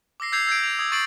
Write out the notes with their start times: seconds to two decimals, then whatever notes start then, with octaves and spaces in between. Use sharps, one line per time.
0.20 D6 E6 A#6 C7
0.32 E6 G6 G#6 C7 F7
0.47 E6 G6 G#6 D7
0.60 C7 F7
0.79 D#6 G#6
0.92 C#6 A6 C7 D7 F#7